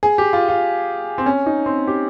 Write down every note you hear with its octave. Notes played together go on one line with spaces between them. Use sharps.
G#4
G4
F4
F4
C4
C#4
D#4
C4
G4